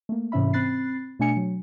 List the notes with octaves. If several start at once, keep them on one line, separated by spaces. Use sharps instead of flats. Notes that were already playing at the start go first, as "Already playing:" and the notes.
A3 A#3
G#2 C3 E3 C#4 E5 B5
C4 B5 F#6 A6 C7
B2 A3 D4 G#5 C#7
F#3